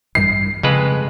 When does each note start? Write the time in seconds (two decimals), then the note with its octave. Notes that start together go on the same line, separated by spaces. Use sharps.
0.15 A1 G2 G3 C7
0.63 F2 C#3 G#3 B4